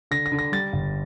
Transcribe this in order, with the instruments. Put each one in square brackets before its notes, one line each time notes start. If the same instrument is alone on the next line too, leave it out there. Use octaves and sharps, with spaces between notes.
[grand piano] D3 A#6
A#6
D3
A#6
G3 A6
G1